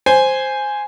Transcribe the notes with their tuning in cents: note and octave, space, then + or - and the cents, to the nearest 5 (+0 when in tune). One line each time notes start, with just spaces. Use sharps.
C5 +0 G#5 +0